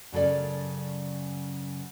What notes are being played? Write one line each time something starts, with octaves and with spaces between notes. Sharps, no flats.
F#2 C#3 A4 D5